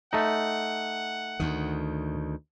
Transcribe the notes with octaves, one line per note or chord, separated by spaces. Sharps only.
A3 D#4 F#5
D2 D#3